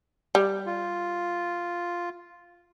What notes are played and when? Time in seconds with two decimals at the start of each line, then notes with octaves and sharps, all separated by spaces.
0.35 G3
0.66 F4